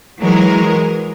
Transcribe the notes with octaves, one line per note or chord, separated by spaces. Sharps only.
E3 F#3 G#3 A#4